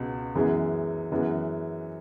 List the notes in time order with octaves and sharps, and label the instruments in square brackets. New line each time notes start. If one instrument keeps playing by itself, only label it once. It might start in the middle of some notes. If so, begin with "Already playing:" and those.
Already playing: [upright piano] C#2 B2
F#2 E3 G#3 B3
F#2 E3 G#3 B3